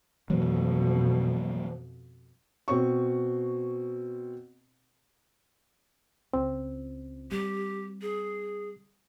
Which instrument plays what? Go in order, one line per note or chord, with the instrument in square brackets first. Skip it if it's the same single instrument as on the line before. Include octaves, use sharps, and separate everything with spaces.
[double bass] F2 B2 [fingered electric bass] E3 F#3 A#3
[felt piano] B2 C4 C#6
[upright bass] C#2 F4 [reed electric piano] C4
[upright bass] G3 [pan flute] G4
[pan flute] G#4